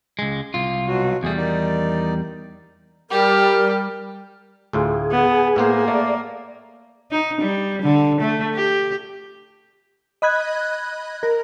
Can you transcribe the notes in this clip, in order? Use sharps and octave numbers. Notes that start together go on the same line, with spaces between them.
C#2 G#3
C2 F4
B2 F#3 F#4
E2 G3 A3 G#4
D#3 D#4 D5
G3 G4 A#4
D2 A2 F4 G#4
B3
A2 A#3 B3 C5
A3 D5
D#4
G3
D3
A3
G4
D#5 B5 F#6 G#6
A#4